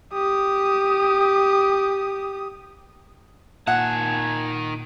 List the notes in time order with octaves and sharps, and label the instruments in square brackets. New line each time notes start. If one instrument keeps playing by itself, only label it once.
[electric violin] G4 D#6
[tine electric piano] A#2 [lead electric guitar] D#3 A5 [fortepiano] F#5 [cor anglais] G#5